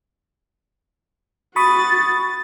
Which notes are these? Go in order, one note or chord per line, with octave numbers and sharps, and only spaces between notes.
F#4 B5 C#6 D#6 A6